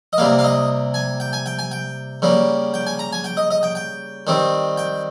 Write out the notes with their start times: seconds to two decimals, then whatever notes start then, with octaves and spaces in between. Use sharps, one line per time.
0.13 D#5
0.18 C3 G3 A#3 F5
0.39 F5
0.44 D#5
0.94 G#5
1.20 G5
1.33 G#5
1.46 G5
1.59 G#5
1.71 G5
2.22 C#3 G3 A#3
2.74 G5
2.87 G#5
2.99 A#5
3.13 G#5
3.24 G5
3.37 D#5
3.51 D#5
3.63 G5
3.75 G5
4.27 D#3 G3 C4
4.77 G5